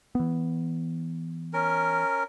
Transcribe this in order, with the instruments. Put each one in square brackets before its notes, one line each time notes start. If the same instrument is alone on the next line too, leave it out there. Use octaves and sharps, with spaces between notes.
[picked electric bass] E3 B3
[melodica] C#4 A#4